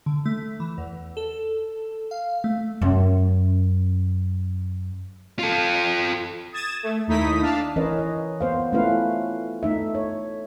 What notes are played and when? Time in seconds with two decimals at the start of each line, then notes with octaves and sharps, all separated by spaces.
0.06 D3
0.26 A3
0.60 E3
0.78 E2
1.17 A4
2.11 F5
2.44 A3
2.82 F#2 C#4
5.39 F4 A4
6.53 D#6 G#6 A6 E7
6.83 A3
7.07 D#2 A3 D#4 E4 D#6 B6
7.41 D4 F5 A5
7.76 E3 C#4 A#4 B4 C#5 D#5
7.99 D#5
8.41 B3 C5 F5
8.73 A3 C#4 E4 F4 B4 F5
9.63 A3 D#4 E5
9.95 C#5